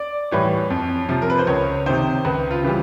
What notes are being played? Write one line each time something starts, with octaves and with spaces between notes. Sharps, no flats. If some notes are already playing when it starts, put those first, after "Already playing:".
Already playing: D5
A2 E3 G3 C#5
F2
C3 F3
A#4
B4
C5
C#2 C#5
C3 D#3 C5
C#2 B4
F4
C#3 E3 G3